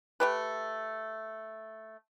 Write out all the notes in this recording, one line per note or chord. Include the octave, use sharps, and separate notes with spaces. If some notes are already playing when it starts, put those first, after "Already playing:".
A3 G4 B4